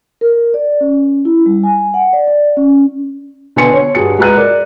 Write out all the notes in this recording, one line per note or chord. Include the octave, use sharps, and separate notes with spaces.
A#4
D5
C#4
E4
G3
G#5
F#5
D5
D5
C#4
B2 D3 B4 G#5 C6 C#7
C#5
G2 F#4 G#4 C#7
G#3 F#4 B4 A#5 F#6 D#7
A#4 D5